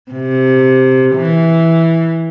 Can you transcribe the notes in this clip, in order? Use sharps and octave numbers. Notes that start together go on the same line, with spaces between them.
C3
E3